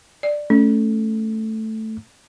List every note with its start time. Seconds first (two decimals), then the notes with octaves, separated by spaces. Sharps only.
0.23 D5
0.50 A3 C#4